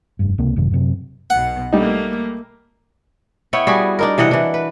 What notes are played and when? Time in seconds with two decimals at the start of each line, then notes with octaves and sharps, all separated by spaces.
0.19 F1 G2
0.38 C#2 C3 G#3 A#3
0.56 G#1 F#2 C3 D#3
0.71 F#2 C3
1.30 B1 B2 F#5
1.73 G3 A3 A#3 D#4
3.53 B3 E4 C#5 G5
3.67 G3 F#4 G#4
3.99 D4 D#4 A#4
4.18 C3 E3 D#5 F#5
4.31 E3 D4
4.54 B4